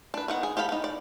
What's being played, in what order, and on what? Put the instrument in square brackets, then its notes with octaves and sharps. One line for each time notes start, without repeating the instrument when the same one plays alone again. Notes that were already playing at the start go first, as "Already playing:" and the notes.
[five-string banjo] D4 B4
D#3 B3 F#5
G#4
G4 A4 F5 B5
B3 D#4
D5